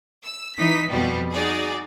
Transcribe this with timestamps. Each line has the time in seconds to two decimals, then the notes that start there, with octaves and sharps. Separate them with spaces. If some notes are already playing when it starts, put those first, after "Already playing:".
0.24 E6
0.57 E3 D#4 B6
0.91 F2 B2 G3
1.33 D#4 F#4 G#4 D5